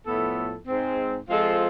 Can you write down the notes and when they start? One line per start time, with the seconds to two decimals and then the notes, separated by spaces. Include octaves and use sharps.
0.05 A2 F3 B3 E4 A4
0.67 G#2 G#3 C4
1.29 F3 G#3 C4 F4 A4